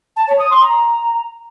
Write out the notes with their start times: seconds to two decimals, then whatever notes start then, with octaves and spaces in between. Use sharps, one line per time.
0.16 A5
0.28 C#5
0.39 D#6
0.50 C6
0.62 A#5